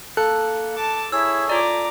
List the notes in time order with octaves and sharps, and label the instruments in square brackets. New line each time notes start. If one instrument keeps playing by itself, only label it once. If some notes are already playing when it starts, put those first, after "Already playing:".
[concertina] A#3 [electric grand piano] A4 [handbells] F#6
[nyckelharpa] A5 [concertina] D6
[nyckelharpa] E4 [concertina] G#4 C#5 [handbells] E6
[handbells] F4 D5 [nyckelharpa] A#5 D6